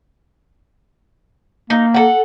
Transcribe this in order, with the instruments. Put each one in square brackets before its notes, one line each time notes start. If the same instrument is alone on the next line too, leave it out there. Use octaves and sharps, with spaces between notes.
[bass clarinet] A#3 [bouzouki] D#4
[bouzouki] A4 F#5